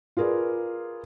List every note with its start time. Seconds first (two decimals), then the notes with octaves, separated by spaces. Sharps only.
0.17 F4 G#4 A#4 B4 D5